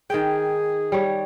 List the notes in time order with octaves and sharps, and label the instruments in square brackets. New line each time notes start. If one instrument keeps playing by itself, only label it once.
[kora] D#3 G5 [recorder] G#4
[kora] G3 C#5